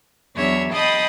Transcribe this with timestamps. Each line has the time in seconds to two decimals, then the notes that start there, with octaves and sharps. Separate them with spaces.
0.35 E2 F#3 D4 C#5 E5
0.72 D#5 G5 A5 B5 C6 D#6